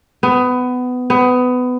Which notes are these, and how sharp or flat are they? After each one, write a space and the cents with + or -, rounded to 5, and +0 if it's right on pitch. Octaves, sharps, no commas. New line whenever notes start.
B3 +20
B3 +20